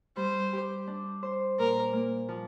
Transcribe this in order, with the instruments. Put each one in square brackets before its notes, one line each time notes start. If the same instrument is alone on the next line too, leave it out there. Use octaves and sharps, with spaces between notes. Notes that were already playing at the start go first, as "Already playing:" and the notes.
[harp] G3 [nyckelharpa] C5
[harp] G4
D4
C5
[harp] A#2 [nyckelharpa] A#4
[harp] A#3
F3